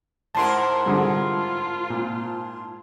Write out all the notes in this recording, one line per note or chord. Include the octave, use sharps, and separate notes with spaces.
G#2 E4 A#4 A5 C6
G2 D3 F4 G#4
A#2